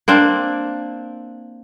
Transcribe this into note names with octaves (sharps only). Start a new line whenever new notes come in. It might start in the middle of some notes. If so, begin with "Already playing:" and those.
A#3 C4 D4